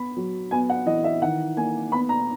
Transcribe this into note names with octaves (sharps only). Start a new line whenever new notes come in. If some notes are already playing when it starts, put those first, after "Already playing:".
Already playing: B3 B5
F#3
B3 G#5
F#5
E3 D#5
E5
D#3 F#5
A#3 G#5
B3 B5
A#5